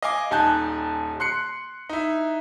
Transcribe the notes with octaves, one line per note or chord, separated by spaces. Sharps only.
D#5 F5 G#5 D6
D#1 D#4 G#5 A5 F#6 G6
C6 F#6 C7 C#7
D#4 E4